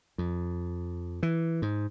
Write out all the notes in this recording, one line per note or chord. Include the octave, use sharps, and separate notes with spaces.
F2
E3
G#2